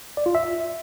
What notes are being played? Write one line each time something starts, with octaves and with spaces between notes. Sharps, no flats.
D5
F4
E5